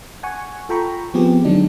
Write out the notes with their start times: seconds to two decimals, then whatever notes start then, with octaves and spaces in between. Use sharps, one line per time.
0.23 F#5 G#5 C#6
0.69 F4 A4 G5 A#5 B5 C#6
1.14 F3 B3 C4 G4 G#4
1.45 D3 F#3 G#3 D4 D#4